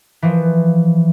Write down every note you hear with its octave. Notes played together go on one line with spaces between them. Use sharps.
E3 F3